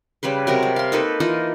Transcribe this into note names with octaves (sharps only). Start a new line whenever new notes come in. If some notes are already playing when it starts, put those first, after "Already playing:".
C#3 G3 B4 C5
C3 F#3 G#3 A#4
G3
F5 C6
A#3 D#4 A4 B4
E3 D#4 F4 D#5